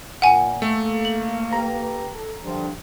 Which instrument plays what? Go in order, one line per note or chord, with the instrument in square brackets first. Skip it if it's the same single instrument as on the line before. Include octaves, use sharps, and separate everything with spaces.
[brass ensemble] A#2 [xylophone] F#5 G#5
[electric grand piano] A3 [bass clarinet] A#3 [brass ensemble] A4
[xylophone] F#7
[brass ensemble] G4 A4 B4 [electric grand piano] A#5
[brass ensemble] A4
[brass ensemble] G2 D3 [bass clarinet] F3